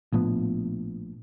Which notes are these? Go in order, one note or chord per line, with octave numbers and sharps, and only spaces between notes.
A#1 A2 F3 B3